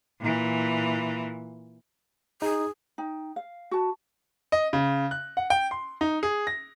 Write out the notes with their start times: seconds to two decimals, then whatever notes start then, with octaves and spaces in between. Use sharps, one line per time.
0.20 A#2 E3
2.42 D#4 G#4
2.98 D#4 G5
3.36 F5
3.71 F#4 A5
4.52 D#5
4.73 C#3
5.11 F#6
5.37 F#5
5.50 G5
5.71 C6
6.01 D#4
6.23 G#4
6.47 A#6